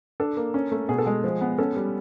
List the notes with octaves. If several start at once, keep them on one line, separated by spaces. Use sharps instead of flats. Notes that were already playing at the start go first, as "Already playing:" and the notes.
D4 A4
A#3
C#4
A3
B2 G#4
A4
G#3 G#4
F3
B3
C#4 A4
G3